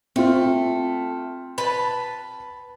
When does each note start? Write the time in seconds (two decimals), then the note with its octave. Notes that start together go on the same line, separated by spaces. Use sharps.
0.16 A3 C4 F4
1.58 B4 A5